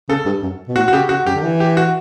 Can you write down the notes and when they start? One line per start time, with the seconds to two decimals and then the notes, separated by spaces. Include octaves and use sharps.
0.09 C#3 A4
0.26 G2
0.42 F#2
0.68 B2
0.76 A2 F#4
0.88 F#4
0.93 C#3 G4
1.09 C#3 F#4
1.26 F#2 G4
1.35 D3
1.43 E3
1.60 G4
1.77 F#4